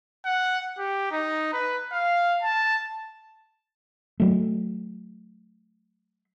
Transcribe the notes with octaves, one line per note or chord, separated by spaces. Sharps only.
F#5
G4
D#4
B4
F5
A5
F#3 A3